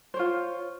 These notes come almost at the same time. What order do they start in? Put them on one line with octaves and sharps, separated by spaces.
C5 C#5 F4